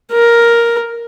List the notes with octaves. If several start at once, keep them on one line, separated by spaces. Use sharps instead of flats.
A#4